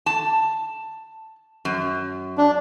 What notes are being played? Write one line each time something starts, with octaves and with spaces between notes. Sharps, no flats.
A5
F#2
D4